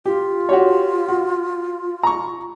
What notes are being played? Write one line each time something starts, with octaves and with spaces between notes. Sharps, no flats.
F4 G4
F#4 G4 C#5
F#4
A#5 C#6